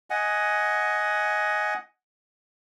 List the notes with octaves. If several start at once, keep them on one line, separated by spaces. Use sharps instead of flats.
D#5 F#5 G#5